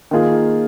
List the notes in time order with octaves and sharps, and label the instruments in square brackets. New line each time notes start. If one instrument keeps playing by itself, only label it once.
[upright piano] D#3 A#3 F4 G#4